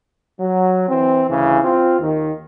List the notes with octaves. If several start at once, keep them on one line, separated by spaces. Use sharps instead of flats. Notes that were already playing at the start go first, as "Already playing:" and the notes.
F#3
E3 C4
D2 C#3 E3
C4 F4
D#2 D#3